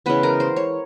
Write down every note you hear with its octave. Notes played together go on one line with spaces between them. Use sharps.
C#3 E3 G#3 B3 B4
A#4
C5
C#5